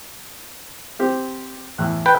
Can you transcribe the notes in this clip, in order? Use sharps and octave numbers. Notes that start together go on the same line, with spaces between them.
C4 G4
E2 A2 F#6
B4 G5